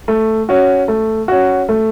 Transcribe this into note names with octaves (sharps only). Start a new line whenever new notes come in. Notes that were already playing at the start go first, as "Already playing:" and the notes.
A3
C#4 F#4
A3
C#4 F#4
A3